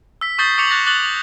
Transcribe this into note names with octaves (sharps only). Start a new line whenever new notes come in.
E6 B6
C#6 D#6 G6 A6 C7 G7
C#6 D6 C#7 F7 F#7
F#6 A6 A#6
D6 F#6 A6 F#7 G7
F7